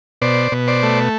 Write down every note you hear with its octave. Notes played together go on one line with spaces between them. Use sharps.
B2 C5 D5
B2
C5 D5
A3